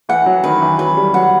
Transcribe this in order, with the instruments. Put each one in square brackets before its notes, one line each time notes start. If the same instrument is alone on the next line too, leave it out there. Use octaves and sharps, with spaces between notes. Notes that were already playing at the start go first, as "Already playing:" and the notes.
[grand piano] E3 [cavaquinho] F#5
[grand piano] F#3
[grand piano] D#3 [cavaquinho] B4
[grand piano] E3
[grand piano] F#3 [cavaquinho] B4
[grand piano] G3
[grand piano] F#3 [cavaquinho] F#5